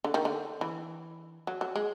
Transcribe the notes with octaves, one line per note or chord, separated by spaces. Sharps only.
D3
D#3
D3
E3
F#3
F#3
G#3